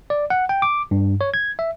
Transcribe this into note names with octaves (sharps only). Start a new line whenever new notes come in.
D5
F#5
G5
D6
G2
C#5
G#6
E5